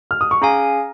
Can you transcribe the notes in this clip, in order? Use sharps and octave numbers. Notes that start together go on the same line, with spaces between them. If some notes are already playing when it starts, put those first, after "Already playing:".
F6
D#6
C#6
C#4 G#4 F5 G#5 A#5